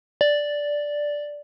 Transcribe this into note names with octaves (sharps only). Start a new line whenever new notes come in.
D5